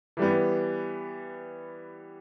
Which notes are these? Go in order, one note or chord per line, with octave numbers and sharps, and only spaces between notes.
E3 G3 B3